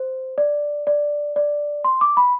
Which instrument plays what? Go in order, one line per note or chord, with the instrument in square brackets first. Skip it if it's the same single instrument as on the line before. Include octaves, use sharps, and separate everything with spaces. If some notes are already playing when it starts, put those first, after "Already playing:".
Already playing: [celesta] C5
D5
D5
D5
C6
D6
B5